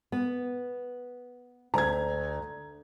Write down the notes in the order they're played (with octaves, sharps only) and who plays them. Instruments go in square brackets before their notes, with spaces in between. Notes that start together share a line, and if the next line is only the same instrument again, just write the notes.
[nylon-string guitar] B3
[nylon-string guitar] D2 [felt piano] A#5 G#6